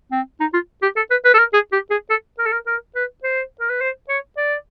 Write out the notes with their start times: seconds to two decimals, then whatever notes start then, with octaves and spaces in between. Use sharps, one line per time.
0.12 C4
0.40 D#4
0.53 F4
0.82 G4
0.96 A4
1.10 B4
1.25 B4
1.34 A4
1.38 A#4
1.53 G#4
1.72 G4
1.90 G#4
2.10 A4
2.39 A#4
2.46 A4
2.52 A#4
2.67 A#4
2.95 B4
3.23 C5
3.60 A#4
3.70 B4
3.81 C5
4.09 C#5
4.37 D5